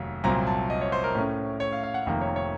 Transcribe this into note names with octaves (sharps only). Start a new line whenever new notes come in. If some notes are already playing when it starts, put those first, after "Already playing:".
Already playing: F1 D#2 F#3
C2 A#2 F#3 C4 A#5
A5
D#5
C#5
C5
A#4
A2 A3 C#4
C#5
F5
F5
F#5
F1 F2 C3 D#3 A#3
C#5
C#5